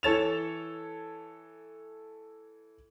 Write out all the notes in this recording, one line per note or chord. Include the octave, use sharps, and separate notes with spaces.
E3 A4 C#5 A6 E7 F7